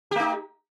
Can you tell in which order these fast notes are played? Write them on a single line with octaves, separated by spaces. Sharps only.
G4 A3 D#4